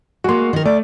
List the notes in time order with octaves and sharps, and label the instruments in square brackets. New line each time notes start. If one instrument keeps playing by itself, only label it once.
[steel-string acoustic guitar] G#3 A#3 [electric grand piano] F#4 C6
[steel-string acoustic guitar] D#3 A#4
[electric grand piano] A3 [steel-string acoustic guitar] D5